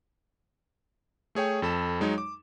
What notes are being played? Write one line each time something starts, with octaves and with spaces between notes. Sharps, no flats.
A3 G#4 C#5 G5
F2 A4 B5 E7
F#3 G#3 D#4 C#5
D6